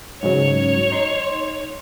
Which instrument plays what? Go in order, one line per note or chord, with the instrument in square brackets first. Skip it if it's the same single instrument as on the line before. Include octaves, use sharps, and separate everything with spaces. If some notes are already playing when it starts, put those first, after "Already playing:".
[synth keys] G#2 C#3 F#3 [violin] C#5
[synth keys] D#4 C6